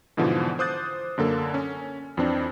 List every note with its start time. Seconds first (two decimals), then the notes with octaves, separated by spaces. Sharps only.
0.17 G#2 B2 D3 E3 F3
0.59 C5 D6 D#6 F#6 G6 A6
1.18 F#2 D3 A#3 A4 A5
1.54 C#4
2.17 F2 E3 C4 D4